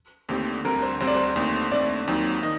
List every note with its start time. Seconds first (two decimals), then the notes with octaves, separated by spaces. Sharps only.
0.29 D#2 D3 A3 C4 G4
0.65 D2 D3 G3 C4 A#4
0.82 C5
1.00 D2 D3 G3 C4 C5
1.07 D5
1.15 C5
1.36 D#2 D3 A3 C4
1.71 D#2 D3 A3 C4 D5
2.07 D#2 D#3 F#3 C4
2.43 D#3 D#5